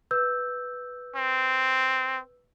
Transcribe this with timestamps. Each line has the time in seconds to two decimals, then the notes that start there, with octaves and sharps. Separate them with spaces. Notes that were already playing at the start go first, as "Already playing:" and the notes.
0.11 B4 E6 G6
1.16 C4